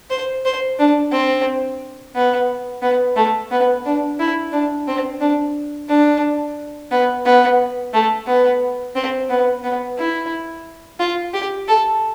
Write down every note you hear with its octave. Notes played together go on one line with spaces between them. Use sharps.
C5
C5
D4
C4
B3
B3
A3
B3
D4
E4
D4
C4
D4
D4
B3
B3
A3
B3
C4
B3
B3
E4
F4
G4
A4